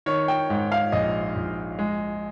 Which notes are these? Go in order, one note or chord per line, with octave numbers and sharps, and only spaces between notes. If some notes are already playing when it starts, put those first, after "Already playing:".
D#3 C#5
G5
G#2
F5
A#1 D#5
A#1
G#3